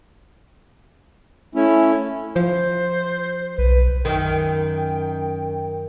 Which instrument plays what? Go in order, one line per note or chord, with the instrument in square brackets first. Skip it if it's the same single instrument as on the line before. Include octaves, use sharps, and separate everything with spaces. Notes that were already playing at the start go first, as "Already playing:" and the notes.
[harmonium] A3 C#4 E4
[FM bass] F3 [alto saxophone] C5
[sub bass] B1 [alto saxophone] B4
[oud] F#2 D#3 [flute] G5